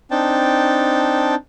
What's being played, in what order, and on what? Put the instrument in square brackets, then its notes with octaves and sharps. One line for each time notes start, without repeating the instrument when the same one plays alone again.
[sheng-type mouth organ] C4 D4 D#4 G5 A5